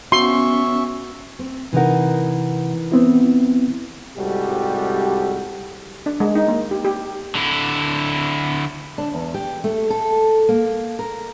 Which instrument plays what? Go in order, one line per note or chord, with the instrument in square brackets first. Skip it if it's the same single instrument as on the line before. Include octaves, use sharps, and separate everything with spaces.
[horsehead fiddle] B3 C#4 [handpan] F#4 [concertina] E5 C#6 [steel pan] C6
[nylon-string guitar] C4
[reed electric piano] C3 F#5 [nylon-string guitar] E3 D#4 A#4
[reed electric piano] B3 C4 E4
[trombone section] C2 G#2 G3 F#4 G4 A4
[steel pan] D4
G#3
D#4
A#3
G4
G4
[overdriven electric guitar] D3 E4
[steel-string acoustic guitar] D4
E2
G4
A3
A4
A#3
A#4